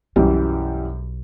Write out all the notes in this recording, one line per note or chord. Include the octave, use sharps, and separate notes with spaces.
B1 F#2 E3 G3